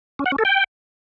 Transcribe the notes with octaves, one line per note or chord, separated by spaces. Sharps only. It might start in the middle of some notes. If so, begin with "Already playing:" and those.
C#4
F#5
C#4
A4
G5